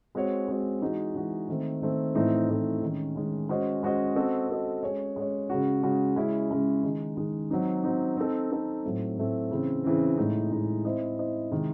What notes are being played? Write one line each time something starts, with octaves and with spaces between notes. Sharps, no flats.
G#3 C4 F#4 C#5
G#3 C4 F#4 C#5
E3 G#3 D#4 F#4
E3 G#3 D#4 F#4
D#3 A3 C4
D#3 A3 C4
A2 E3 A3 C4 D#4
A2 E3 A3 C4 D#4
D#3 G#3 C#4
D#3 G#3 C#4
G#3 C#4 F#4 C5 D#5
G#3 C#4 F#4 C5 D#5
C4 F#4 A4 D#5
C4 F#4 A4 D#5
G#3 C#4 G#4 C#5
G#3 C#4 G#4 C#5
C#3 G#3 C#4 F#4
C#3 G#3 C#4 F#4
C#3 G#3 C#4 E4
C#3 G#3 C#4 E4
D#3 G#3 D#4 G#4
D#3 G#3 D#4 G#4
F#3 C4 D#4
F#3 C4 D#4
C4 D#4 A4
C4 D#4 A4
A2 F#3 A3 C4
A2 F#3 A3 C4
C#3 E3 C4
C#3 E3 C4
A2 G#3 D#4
A2 G#3 D#4
C4 E4 C5 D#5
C4 E4 C5 D#5
C3 D#3 G#3